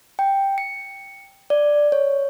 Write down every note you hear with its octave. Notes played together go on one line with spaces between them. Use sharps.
G5
C#7
D5
C#5